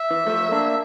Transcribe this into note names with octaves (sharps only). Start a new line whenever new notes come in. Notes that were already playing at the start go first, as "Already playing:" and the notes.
Already playing: E5
E3
F3 A3
A#3 D4